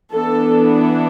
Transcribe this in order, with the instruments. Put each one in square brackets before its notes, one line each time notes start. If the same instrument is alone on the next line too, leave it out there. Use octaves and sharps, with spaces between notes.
[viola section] E3 B3 D4 A4